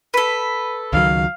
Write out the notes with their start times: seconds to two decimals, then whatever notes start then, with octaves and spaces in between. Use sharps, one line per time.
0.14 A4 B4
0.93 C#2 D#3 F#3 F5